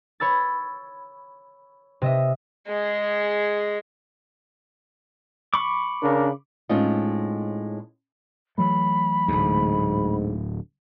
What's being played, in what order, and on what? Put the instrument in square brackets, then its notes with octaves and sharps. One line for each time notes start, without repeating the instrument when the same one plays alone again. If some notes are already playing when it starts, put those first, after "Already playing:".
[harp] C#5 B5 E6 A6
C3 D#5 E5
[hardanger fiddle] G#3 G#4
[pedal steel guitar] B5 C#6 D6
[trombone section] C#3 D4 A#4
[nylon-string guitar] A2 G#3 C4 C#4 D#4 F4
[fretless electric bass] E3 F#3 A3 [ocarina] B5
[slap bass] D1 D2 [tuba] G#2